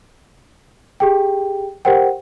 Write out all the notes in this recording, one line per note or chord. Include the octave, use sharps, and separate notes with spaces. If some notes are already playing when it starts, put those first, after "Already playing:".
G4 G#4 G5
G4 A#4 C5 F#5 G5